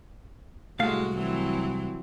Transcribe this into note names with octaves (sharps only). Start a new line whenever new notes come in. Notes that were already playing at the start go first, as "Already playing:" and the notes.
C2 A2 G#3 A3 F#4 F5
E3 F#3 C4